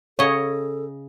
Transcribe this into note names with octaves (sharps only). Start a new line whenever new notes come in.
C#3 A4 C#5 D#5